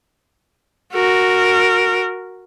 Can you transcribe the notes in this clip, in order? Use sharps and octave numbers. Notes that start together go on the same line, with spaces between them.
F#4 A#4